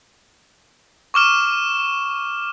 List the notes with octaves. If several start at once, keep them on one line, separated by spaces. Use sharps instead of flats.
C#6 D6 F6 E7